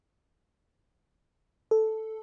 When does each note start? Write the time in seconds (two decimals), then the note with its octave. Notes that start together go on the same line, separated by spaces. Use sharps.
1.71 A4